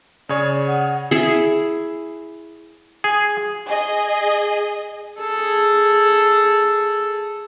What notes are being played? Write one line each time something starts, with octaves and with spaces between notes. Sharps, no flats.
C#3 G#4 C#5 D5
F#5
E4 G#4
G#4
G#4 D#5
G#4 A4